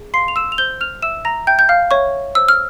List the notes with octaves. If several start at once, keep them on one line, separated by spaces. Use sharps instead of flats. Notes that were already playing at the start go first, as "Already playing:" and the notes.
Already playing: G#4
F5 C6 C7
F7
E6 E7
F7
C5 G6 G7
F6 F7
E5 E6 E7
A#5 A#6
E5 G5 G6
G6
F5 F6
C#5 E5 C#6
C5 E6
F6